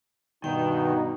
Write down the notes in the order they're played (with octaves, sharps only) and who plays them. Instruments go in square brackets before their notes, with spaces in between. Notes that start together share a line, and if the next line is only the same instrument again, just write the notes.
[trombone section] G2 B2 [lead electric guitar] D#3 [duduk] D#4 [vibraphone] G5